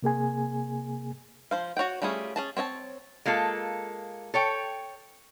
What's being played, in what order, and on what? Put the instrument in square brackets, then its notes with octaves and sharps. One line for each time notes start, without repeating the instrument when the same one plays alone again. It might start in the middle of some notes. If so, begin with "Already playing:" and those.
[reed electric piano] C3 A#3 G#4 G#5
[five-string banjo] F3 C5 F5
F#4 C#5 F#5 G5
G3 A3 C#4 F4 G#4
C#4 G#4 A5
C4 C#5 D#5 A5
[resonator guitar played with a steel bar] G#3 A#3 F4 A4
A4 C#5 G5